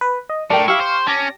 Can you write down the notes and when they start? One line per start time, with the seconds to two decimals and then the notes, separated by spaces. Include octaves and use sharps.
0.01 B4
0.30 D#5
0.50 A2 D4 A#4 G5
0.68 E4 G4 F5 C#6
0.81 C5
1.07 C#4 A5 D6 A#6